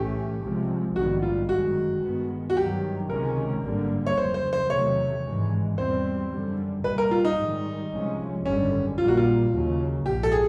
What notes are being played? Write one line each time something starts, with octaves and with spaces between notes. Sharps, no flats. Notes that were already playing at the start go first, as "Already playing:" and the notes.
Already playing: B1 A2 E3 A3 C#4 G4
C2 C3 F3 G#3
A#1 G#2 D#3 G3 B3 F#4
F4
G1 F#2 D#3 G#3 F#4
G2 D#3 G#3 B3
F#4
G2 D#3 F#3 G4
C#2 C3 D#3 G#3 C#4 A#4
G#1 G2 D3 G3 A#3
C#5
F1 F2 C#3 F#3 C5
C5
C5
E2 C3 D#3 F#3 A3 C#5
G#1 G2 E3 G#3
E2 B2 G3 C4 C5
F#2 D3 G3
C2 A#2 G3 B4
A#4
F4
D#4
G#2 D#3 G3
C2 C3 F3 G#3 C#4
G#1 F#2 D3 G3 C#4
A#1 A#2 G3 A#3 F4
F#4
F4
D#2 C#3 F#3 A#3
A#1 G#2 F3 G4
A4
G#4